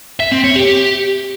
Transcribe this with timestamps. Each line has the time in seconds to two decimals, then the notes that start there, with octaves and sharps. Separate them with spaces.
0.20 E5
0.32 C4
0.44 C#5
0.56 G4